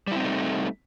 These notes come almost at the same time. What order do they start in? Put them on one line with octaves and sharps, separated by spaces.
G3 E4 C4 D#4 A3